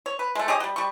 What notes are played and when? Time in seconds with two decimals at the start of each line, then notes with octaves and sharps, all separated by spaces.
0.06 C#5
0.19 B4
0.35 G#3 A3
0.48 G4 G#4 C#5 D#5
0.60 F#3 G3
0.76 G3 C#6